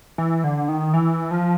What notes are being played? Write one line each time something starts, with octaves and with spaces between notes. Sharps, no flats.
E3
D3
D#3
E3
F3